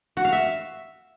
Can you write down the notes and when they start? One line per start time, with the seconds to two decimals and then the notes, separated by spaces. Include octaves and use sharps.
0.17 F#4
0.25 F5
0.32 E5